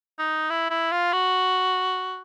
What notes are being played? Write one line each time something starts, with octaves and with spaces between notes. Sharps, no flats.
D#4
E4
E4
F4
F#4